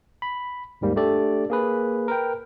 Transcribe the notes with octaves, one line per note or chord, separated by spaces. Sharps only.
B5
D#2 G#2 G3 A#3
A3 D4 G4 A4 D5
A#3 G#4 B4
A#4 B4 G5